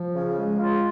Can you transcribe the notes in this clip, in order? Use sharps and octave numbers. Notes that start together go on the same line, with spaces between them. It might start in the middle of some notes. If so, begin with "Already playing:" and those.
Already playing: F3
C#3
G#3
F4